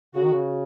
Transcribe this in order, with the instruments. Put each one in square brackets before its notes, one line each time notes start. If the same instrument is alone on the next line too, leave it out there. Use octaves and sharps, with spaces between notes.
[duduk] C#3 [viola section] F#4
[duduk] D#3
C#3